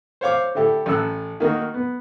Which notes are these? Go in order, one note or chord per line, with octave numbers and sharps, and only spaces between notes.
C5 C#5 F5 D6
D3 E4 G4 A4
A1 A4 E6 F#6
D#3 A#3 D#4 F#4
B3